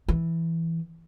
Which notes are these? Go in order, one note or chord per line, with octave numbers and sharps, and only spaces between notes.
E3